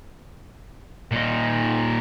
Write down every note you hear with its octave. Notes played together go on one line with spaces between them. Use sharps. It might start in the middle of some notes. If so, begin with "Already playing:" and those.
A#2 D#4